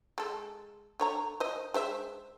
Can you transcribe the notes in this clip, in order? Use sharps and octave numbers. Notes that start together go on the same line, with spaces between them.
G#3 A4
D3 C#5 A#5
C5 D#5
G#3 C5 E5